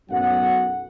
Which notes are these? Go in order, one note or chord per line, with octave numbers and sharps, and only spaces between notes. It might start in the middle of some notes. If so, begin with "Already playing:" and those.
B1 F#2 A2 F#3 F#5